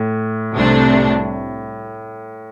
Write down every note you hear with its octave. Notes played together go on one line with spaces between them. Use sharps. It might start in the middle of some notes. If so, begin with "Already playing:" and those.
Already playing: A2
C2 C3 A3 D4